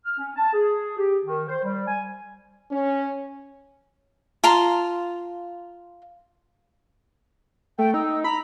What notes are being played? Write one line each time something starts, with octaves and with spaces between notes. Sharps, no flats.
F6
C#4
A5
G#4
G4
D#3
C5
G3
G#5
C#4
F4 A5 A#5 C6
A3 G5
D#4 E6
A#5 B5